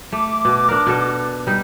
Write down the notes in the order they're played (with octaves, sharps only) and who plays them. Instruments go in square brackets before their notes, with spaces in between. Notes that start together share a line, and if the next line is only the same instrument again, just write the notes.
[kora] A3 [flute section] D6
[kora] B2
D4 A#4
B2 A4
G3 D#4